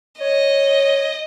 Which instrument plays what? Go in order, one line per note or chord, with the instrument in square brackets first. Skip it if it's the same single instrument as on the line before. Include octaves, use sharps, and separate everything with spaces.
[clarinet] C#5 [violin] D#5